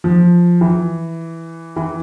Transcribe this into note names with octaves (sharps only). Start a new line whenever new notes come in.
F3
E3
E3